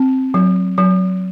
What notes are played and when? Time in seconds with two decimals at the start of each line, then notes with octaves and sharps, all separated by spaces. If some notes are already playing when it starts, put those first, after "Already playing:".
Already playing: C4
0.34 F#3
0.78 F#3